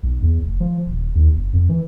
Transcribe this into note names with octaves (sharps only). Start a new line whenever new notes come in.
B1
E2
F1
F3
D#1
D#2
F#1
F2
E3